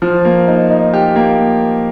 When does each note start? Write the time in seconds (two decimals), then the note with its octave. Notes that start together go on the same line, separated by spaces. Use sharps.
0.02 F3
0.25 A#3
0.48 D#4
0.70 D#4
0.94 G4
1.16 A#3